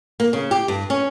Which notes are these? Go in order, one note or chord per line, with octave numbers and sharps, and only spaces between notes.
A#3
C#3
G4
G2
C#4